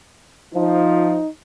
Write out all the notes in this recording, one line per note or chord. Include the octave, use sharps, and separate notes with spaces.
F3 D#4